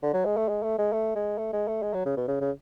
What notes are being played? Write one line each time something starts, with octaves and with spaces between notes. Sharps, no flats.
D3
F#3
G#3
A3
G#3
A3
G#3
A3
G#3
A3
G#3
A3
G#3
F#3
C#3
B2
C#3
C#3